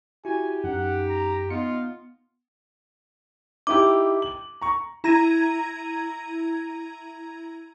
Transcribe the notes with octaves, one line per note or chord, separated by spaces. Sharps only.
E4 F#4 G4 G#5
F#2 D#4 F#5
A#5
B3 D#4 F4 C#7
D#4 E4 G4 D6
F#7
A#5 C#6
E4 A#5 G#6 A#6 D#7